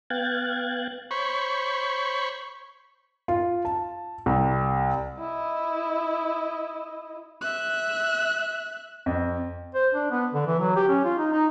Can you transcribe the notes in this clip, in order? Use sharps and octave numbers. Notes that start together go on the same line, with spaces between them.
B3 F5 G5 F#6 G#6 A6
C5 C#5 B5 C#6
F4
A5
C2
E4 D#5
E5 F#6
F2
C5
D4
B3
D3
E3
F#3
G4
C#4
F4
D#4
D#4